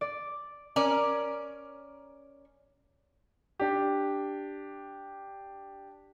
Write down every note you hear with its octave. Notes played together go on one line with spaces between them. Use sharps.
D5
C#4 A#4 D5
D4 G4